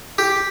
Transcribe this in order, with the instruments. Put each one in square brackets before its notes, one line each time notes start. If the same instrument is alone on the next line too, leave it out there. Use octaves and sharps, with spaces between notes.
[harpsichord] G4